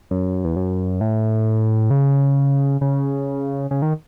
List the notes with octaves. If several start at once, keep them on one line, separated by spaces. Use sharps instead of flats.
F#2
E2
F#2
A2
C#3
C#3
C#3
D#3